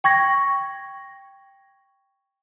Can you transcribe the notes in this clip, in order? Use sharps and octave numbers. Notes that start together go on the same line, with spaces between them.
G5 C#6 G#6 A#6